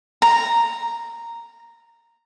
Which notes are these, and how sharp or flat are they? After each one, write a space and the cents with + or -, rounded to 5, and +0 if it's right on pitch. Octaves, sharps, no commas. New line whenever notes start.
A#5 -5